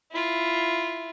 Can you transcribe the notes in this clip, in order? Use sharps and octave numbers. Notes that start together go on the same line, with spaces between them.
E4 F4